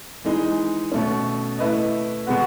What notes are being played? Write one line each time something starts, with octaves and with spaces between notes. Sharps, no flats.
E3 G#3 D#4 G#4
B2 A3 C#4
A3 E4 B4 D#5
B2 G#3 B3 F#4